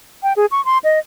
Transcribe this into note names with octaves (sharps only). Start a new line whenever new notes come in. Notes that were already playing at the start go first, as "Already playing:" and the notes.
G5
G#4
C#6
C6
D#5